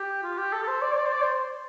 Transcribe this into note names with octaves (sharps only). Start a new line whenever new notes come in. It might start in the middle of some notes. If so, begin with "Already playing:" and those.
Already playing: G4
F4
G4
A4
A4
C5
D5
C5
D5
C5
D5
C5